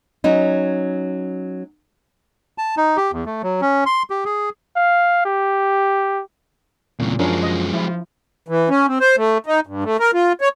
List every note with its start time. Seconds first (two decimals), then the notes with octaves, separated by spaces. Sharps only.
0.24 F#3 C#4 D#4
2.58 A5
2.77 D#4
2.97 G4
3.12 E2
3.26 A3
3.43 F#3
3.61 C#4
3.86 C6
4.10 G4
4.25 G#4
4.77 F5
5.26 G4
7.00 D1 E2 A#2 C#3
7.19 F#2 F3 F#3 G#3 C#4 D4 A#4
7.43 D#5
7.73 F3 E4
8.48 E3
8.70 C#4
8.88 C4
9.00 C5
9.17 A3
9.46 D#4
9.67 G2
9.84 A3
10.00 A#4
10.14 F4
10.41 C#5